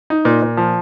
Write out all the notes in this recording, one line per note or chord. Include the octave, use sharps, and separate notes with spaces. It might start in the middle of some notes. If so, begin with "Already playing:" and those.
D#4
A#2
A#2
F3